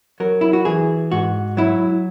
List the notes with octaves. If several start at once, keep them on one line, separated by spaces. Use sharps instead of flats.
F#3 A#4
E4
F#4
E3 G#4
G#2 F#4
F#3 E4